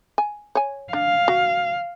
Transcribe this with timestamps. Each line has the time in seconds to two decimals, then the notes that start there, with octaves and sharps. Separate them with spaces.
0.18 G#5
0.55 C#5 G#5
0.93 D4 F5
1.28 F#4